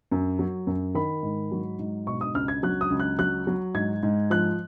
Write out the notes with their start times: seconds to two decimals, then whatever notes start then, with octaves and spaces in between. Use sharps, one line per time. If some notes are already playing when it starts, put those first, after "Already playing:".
0.12 F#2
0.39 F#3
0.67 F#2
0.95 D#3 B5
1.23 G#2
1.52 F#3
1.79 G#2
2.06 B2 C#6
2.21 D#6
2.34 C#2 F6
2.48 G#6
2.63 F#3 F#6
2.81 D#6
2.90 C#2
3.00 F#6
3.19 F#3 F#6
3.47 F#3
3.74 G#2 G#6
4.03 G#2
4.30 F3 F#6